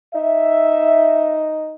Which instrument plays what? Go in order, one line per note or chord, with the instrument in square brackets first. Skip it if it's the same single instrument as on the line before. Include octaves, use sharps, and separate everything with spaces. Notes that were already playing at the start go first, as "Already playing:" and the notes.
[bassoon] D#4 [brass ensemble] E5